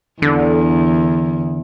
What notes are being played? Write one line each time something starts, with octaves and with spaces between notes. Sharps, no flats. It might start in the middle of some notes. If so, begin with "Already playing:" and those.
E2 D3